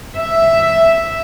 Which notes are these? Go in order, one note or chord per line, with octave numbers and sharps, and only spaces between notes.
E5